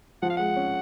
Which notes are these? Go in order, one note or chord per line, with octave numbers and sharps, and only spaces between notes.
F3 F#5
F5
G#3 F#5
C#4